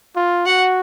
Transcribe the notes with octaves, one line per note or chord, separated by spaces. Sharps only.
F4
F#4 F#5